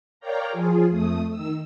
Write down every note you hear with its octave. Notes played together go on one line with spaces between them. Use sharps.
A#4 C#5 D5 F5 G5 A#5
F3 F4 G#4
F2 A3 D#6
D#3 E6